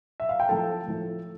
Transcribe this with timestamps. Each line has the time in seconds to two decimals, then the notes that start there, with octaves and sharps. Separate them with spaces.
0.20 E5
0.29 F5
0.40 G5
0.49 A2 F3 A3 A4 A5
0.87 A2 F3 A3